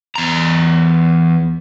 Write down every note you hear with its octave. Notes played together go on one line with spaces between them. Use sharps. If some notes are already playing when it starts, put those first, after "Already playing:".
E2 A#5